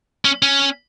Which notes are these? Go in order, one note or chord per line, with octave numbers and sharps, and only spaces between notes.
C#4
C#4